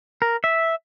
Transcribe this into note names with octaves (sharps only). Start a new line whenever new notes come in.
A#4
E5